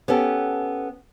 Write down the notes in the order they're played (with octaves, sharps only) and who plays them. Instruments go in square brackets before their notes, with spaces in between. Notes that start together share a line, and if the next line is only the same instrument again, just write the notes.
[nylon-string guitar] B3 C#4 G4 A4